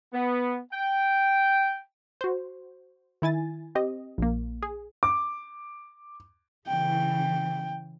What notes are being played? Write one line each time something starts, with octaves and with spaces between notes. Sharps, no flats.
B3
G5
F#4 C5
D#3 E4 G#5 A6
C4 G4 D#5
A#1 A#3
G#4
D6
C#3 E3 G5